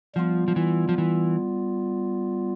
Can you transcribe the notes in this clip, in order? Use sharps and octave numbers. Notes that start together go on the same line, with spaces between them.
F3 G3 B3 F4
F3
E3
F3
E3